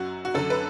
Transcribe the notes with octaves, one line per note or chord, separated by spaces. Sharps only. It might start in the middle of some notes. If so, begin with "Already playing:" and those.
Already playing: F#2 F#3 F#4
F#4
F#2 D3 F#3 A4
B4